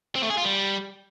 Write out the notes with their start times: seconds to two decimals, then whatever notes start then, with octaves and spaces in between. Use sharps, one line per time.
0.16 C4
0.23 A3
0.30 G#4
0.37 F4
0.44 G3